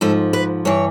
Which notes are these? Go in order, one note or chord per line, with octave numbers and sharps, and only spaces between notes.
G#2 F3 A4
B4
G2 E3 C#5